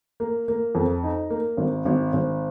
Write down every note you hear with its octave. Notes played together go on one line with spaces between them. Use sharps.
A#3
A#3
F2
D#4
A#3
G#1
G#1
G#1